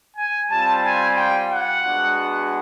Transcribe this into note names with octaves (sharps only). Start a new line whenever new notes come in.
G#5
G3 C4 F4 A5
G#5
G5
F#5
G#3 B3 D4 F#4